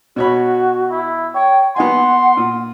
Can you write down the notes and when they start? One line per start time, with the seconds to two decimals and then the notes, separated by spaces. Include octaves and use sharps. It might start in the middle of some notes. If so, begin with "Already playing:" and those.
0.16 B2 F#4 C#5 B5
0.91 E4
1.35 C#5 G5
1.76 B3 D#4 F#5 G#5 C6
2.37 A#2